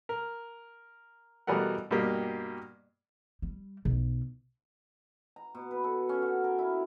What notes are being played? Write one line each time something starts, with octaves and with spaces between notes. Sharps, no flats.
A#4
B2 E3 G3 A3 A#4 F#5
G2 B2 A#3 G4
G3
B1
A#5
B2
B4
A4
C#4
F#4
A#4
E4